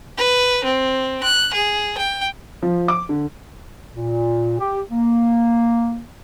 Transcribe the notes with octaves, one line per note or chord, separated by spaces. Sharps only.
B4
C4
F#6
G#4
G5
F3
D6
D3
A#2
G4
A#3